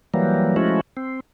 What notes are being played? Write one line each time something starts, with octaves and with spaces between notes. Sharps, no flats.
E3 F#3 G3 A#3
F3 G#3 A3 C#4 E4 F#4
C4